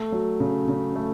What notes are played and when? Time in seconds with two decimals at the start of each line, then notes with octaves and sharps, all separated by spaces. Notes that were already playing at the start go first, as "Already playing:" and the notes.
Already playing: A3
0.12 F#3
0.40 C#3
0.68 C#3
0.96 A3